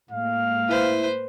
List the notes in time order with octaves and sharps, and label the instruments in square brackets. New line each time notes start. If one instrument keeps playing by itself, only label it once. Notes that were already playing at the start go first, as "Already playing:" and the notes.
[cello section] A2 G#3 A#3 [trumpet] F5
[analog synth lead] E4 [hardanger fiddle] B4 C5